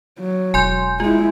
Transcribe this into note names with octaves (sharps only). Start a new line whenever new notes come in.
F#3
E1 G#5 C6 G6
G#3 E4 F4